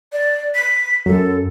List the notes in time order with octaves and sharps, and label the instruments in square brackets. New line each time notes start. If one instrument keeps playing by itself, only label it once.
[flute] D5
B6
[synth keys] F#2 [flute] A4